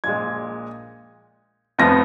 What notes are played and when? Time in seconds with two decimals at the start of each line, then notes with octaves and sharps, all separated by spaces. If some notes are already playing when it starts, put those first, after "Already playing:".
0.04 A#1 A#2 G#3 G#6
1.78 F1 F2 F3 B3 A#6